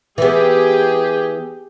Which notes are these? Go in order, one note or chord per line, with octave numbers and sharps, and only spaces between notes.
E3 B3 G4 G#4